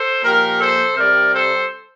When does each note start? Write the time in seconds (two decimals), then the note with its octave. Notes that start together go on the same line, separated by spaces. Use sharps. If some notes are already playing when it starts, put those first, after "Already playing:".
Already playing: A4 C5
0.23 A#2 F3 G4 A#4
0.59 A4 C5
0.96 C3 G3 A#4 D5
1.33 A4 C5